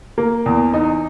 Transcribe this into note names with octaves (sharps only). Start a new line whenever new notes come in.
A#3
E2
D#4